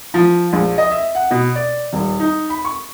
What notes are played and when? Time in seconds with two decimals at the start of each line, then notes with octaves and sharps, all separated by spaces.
0.14 F3
0.53 A#1
0.78 D#5
0.91 E5
1.15 F#5
1.31 B2
1.55 D5
1.93 D#1
2.20 D#4
2.50 B5
2.65 C#6